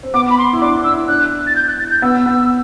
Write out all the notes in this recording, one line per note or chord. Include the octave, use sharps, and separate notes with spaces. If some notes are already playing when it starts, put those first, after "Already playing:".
C4
B3 D6
B5
C6
E4
D4 D6
D4
E6
E4
D4 F#6
A6
G6
F#6
A6
G6
B3 E6
B3